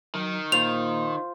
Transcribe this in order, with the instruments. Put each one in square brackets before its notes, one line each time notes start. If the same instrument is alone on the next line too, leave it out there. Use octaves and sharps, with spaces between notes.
[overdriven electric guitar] D#3 [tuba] F#3
[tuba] A#2 [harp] F4 C5 [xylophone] F7